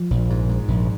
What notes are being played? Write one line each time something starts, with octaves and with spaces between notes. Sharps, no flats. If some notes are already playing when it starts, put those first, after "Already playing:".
Already playing: F3
A#1
G#2
G#2
A#1